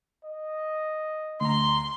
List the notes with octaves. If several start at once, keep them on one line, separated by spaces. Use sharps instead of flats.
D#5
D2 A#5 C6